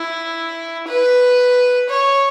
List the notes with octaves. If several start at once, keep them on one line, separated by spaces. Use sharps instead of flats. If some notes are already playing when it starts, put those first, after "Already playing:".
Already playing: E4
B4
C#5